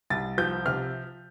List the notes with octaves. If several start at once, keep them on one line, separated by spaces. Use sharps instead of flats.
C2 A6
F3 G6
C3 F6